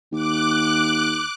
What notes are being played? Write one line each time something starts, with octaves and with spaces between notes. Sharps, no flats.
D#2 D6 F#6